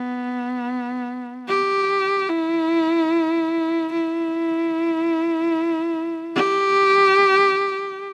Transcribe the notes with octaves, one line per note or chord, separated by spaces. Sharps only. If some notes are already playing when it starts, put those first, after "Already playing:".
Already playing: B3
G4
E4
E4
G4